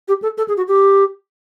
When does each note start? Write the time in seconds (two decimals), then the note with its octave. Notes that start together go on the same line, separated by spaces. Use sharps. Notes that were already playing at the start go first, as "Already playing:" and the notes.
0.08 G4
0.22 A4
0.38 A4
0.48 G#4
0.57 F#4
0.68 G4